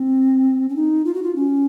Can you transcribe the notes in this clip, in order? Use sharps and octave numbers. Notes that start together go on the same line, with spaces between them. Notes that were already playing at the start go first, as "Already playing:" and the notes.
Already playing: C4
C#4
D#4
F4
F#4
F4
C#4